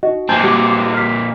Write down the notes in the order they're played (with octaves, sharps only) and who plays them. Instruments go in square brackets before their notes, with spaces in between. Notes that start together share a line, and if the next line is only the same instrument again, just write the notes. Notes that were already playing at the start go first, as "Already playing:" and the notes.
[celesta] D#4 D#5 [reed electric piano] F#4
[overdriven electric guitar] A#2 C4 [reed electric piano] G#5 A5 G6
[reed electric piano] G3 F#4 D6
[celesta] F6 B6